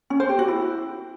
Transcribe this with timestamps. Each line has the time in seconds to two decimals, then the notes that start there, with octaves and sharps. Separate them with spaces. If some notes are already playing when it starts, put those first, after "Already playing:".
0.10 C#4
0.20 C5
0.29 G4
0.39 F#4
0.48 E4